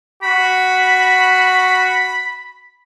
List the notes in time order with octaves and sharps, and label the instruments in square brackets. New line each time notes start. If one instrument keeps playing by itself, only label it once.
[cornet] F#4 [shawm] B5